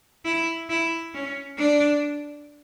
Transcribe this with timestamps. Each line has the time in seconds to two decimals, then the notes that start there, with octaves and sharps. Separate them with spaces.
0.25 E4
0.69 E4
1.14 C#4
1.58 D4